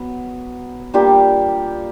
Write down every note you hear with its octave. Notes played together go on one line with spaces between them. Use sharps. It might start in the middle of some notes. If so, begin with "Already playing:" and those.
Already playing: F#3 B3
G3 A#3 D4 F4 G4